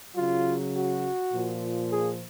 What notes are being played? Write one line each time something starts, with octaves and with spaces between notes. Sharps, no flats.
C#3 F#3 F4
F#4
A#2 F3
G#4